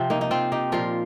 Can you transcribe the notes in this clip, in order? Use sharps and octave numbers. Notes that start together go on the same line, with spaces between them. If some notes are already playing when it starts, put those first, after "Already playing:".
Already playing: C3 F3 C4
A#3 D#4
D#4
C4 F4
D#4 G4
A#2 F3 F4 A#4